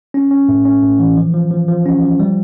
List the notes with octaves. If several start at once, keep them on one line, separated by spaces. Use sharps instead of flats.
C#4
C#4
A2
C#4
A2
E3
F3
F3
F3
F3
C#4
F3
G3